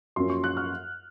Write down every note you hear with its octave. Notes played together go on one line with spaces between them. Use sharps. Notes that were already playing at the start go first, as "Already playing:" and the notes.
F#2 F3 A#3 C#4 C6
C#6
F#6
F6